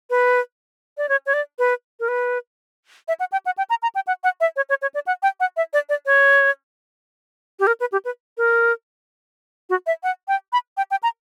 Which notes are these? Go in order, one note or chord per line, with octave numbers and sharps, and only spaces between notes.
B4
D5
C#5
C#5
D5
B4
A#4
B4
E5
F#5
G5
F#5
G5
A#5
A#5
G5
F#5
F#5
E5
C#5
C#5
C#5
D5
F#5
G5
F#5
E5
D5
D5
C#5
G4
A#4
B4
G4
B4
A#4
F#4
E5
F#5
G5
B5
G5
G5
A#5